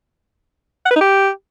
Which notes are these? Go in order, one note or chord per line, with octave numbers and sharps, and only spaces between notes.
F#5
B4
D#4
G4